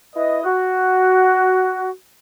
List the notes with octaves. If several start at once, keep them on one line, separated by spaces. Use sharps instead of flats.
E4 B4 D#5
F#4